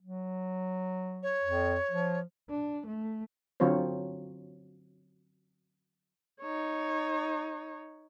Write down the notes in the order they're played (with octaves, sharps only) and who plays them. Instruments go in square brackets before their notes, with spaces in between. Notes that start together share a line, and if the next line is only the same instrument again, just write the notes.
[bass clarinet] F#3
[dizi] C#5
[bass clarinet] F2
F3
[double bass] D4
A3
[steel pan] D3 F#3 C4 F4 C5 C#5
[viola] D#4 C#5